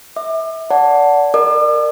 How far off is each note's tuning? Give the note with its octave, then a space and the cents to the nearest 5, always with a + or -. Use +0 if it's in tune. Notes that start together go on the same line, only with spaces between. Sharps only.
E5 -25 D6 +35
D5 -30 F#5 +0 A5 +0
A#4 +0 D5 +30 D6 +40